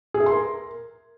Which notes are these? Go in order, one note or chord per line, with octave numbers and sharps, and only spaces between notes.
G#4
E5
C6
A#4